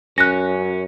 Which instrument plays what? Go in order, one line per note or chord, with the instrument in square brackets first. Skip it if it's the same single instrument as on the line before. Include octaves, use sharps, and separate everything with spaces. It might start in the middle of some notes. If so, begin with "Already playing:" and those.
[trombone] F#2 [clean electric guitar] C#4 [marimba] F#6 A#6